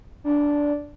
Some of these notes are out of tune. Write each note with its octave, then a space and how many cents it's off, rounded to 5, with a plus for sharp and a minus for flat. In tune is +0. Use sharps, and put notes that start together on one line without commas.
D4 -10